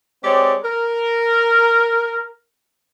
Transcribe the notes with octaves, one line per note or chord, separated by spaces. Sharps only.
G#3 C4 G4 C#5 D5
A#4